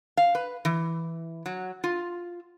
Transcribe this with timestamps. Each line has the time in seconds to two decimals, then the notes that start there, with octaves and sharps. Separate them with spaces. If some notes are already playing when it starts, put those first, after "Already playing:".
0.17 F5
0.35 B4
0.65 E3
1.46 F#3
1.84 F4